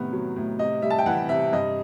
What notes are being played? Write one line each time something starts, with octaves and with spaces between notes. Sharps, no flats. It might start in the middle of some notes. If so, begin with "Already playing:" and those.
Already playing: A2 C3 D#3 B3
F#3
A2
C3 D#5
G3 E5
A5
G5
E3 F#5
C3 E5
G2 D#5